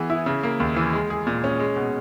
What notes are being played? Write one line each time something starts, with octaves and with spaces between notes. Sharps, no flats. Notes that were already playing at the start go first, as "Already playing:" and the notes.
Already playing: E3 B3 G#4
E4
C#3
A#3
D#2
E3
G#3
G#4
A#2
C#4
G#3
B2